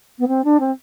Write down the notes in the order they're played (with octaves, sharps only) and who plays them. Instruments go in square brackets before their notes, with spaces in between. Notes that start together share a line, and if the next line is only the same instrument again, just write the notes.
[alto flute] B3
C4
D4
C4